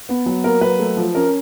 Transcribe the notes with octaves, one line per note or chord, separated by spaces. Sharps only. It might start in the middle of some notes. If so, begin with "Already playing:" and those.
B3
F#3
A#3 A#4
F#3 B4
A3
F3
C#4 A#4